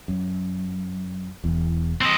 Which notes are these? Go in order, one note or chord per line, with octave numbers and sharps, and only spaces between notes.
F#2
E1 E2
C4 D#5